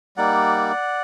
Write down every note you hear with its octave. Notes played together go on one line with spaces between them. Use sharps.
G3 A#3 D#4 D5 F#5